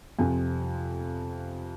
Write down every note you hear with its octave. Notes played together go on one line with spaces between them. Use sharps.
F2 C3 F3 G#5